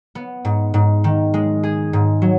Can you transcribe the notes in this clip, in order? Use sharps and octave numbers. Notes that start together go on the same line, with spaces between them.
B3
G#2
G#2
D#3
G#3
G#4
G#2
F#3